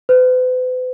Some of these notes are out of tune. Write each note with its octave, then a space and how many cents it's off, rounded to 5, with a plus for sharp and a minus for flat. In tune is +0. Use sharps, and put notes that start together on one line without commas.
B4 +45